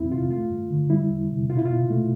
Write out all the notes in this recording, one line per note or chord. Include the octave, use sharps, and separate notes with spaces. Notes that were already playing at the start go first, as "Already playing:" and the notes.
Already playing: E2 F3 C4 E4
C3 F4
A3 F4
G2
D3
G3 E4
E2
C3
B2 F4
E4
B2 F4
A3